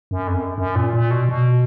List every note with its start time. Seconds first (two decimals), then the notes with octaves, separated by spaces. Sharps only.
0.11 F#2
0.27 F2
0.34 F#2
0.58 F#2
0.75 A#2
0.93 A#2
1.11 B2
1.29 B2